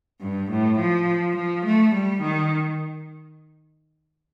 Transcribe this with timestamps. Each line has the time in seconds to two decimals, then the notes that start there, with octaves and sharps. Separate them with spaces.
0.21 G2
0.50 A2
0.79 F3
1.36 F3
1.65 A3
1.94 G3
2.22 D#3